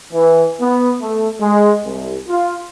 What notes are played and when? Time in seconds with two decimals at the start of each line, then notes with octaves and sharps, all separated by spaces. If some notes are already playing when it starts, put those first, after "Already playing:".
0.12 E3
0.59 B3
1.01 A3
1.40 G#3
1.84 C2
2.27 F4